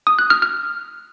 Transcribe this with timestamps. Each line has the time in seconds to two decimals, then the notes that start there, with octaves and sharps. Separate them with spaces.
0.07 D#6
0.19 F#6
0.30 F6
0.42 F6